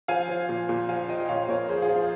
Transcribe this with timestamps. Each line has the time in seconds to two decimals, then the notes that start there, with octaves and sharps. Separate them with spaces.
0.08 F3 F5 G#5
0.29 F3
0.49 A#2
0.69 A#2
0.89 F3 F5 G#5
1.08 F3 D#5 G5
1.20 D#5
1.29 A#2 C#5 F5
1.41 C5
1.49 A#2 A#4 C#5
1.69 F3 G#4 C5
1.82 F4 G#4
1.89 F3
1.96 F4